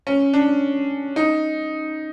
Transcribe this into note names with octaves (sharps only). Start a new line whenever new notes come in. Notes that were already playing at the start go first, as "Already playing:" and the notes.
C#4
D4
D#4